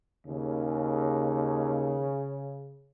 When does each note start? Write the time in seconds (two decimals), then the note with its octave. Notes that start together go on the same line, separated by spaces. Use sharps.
0.26 D#2 C#3